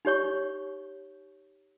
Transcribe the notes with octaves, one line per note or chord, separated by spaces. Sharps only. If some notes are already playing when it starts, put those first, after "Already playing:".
D#4 G4 C#5 C#6